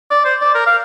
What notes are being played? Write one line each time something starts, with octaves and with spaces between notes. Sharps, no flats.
D5
C5
D5
A#4
F5